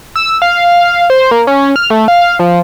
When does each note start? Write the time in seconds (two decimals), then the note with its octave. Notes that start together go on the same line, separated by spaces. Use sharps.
0.16 E6
0.42 F5
0.85 F5
1.10 C5
1.31 A#3
1.47 C#4
1.76 F6
1.90 A3
2.08 F5
2.39 F3